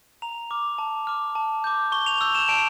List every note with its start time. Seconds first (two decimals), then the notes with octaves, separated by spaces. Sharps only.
0.22 A#5 F7
0.51 D6 F6
0.78 A5
1.07 D6 F6
1.35 A5
1.64 D6 G6
1.92 C#6 G7
2.06 F7
2.21 E6 G6 F7
2.35 E7
2.49 A5 D7